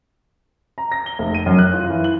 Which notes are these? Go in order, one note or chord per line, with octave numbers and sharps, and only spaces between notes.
A#5
A#6
G7
F1
D#7
F#2
F#6
F4
E3
F#7